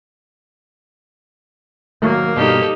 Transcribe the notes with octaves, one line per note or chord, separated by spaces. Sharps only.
D#3 F#3 A#3
G2 B2 D4 D#4 G4 A4